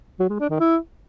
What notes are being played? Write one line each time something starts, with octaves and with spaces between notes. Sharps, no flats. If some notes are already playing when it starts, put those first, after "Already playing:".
F#3
G#3
D4
D#3
E4